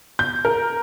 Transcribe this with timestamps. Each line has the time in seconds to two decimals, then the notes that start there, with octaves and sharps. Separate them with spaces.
0.19 G6
0.45 A#4